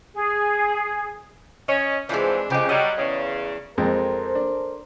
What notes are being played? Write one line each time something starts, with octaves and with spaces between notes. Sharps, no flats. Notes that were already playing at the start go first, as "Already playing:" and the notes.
G#4
C#4 C#5 D#5
G2 E3 F3 G#3 C4 D4
F2 C#3 G#3 G4
F#3 G3 D#5
E2 C#3
F2 G#3 C4 A4 A#4 C5
D4